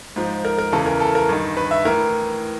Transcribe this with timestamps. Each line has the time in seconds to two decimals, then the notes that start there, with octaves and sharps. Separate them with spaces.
0.16 G#2 F3
0.45 A#4
0.59 A#4
0.72 E2 C#3 E3 A4
0.86 A#4
1.00 A4
1.15 A#4
1.29 G2 D#3
1.57 B4
1.71 E5
1.85 A2 E3 A#4